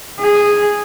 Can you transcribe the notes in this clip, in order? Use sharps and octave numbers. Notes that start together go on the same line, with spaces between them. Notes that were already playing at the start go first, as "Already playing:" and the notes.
G#4